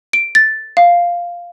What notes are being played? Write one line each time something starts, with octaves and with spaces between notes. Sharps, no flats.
D7
A6
F5